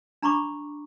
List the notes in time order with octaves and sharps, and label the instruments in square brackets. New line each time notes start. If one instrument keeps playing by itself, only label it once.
[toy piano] D4 A#5 B5 C#6 D6